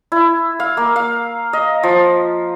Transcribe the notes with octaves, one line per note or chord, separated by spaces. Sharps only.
E4
F5
A#3
F5
D#5
F3